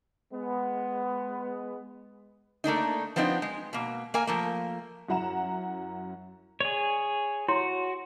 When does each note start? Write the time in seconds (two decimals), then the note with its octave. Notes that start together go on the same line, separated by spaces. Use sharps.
0.32 G#3 B3
2.64 A3 A#3 D4 D#4
3.16 F3 B3 C4 D4 D#4
3.42 G#3
3.73 B2 A#3
4.14 A#3 A#4 G#5
4.27 F3 A3 A#3
5.08 F#2 E4 F#5 A#5 E7
6.60 G#4 C#5 D5
7.48 E4 F#4 C#5 C6